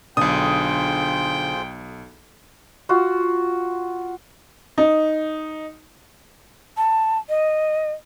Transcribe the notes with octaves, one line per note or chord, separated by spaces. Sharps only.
B1 D3 F4 G#4 C5 G5 D#6
F4 F#4
D#4
A5
D#5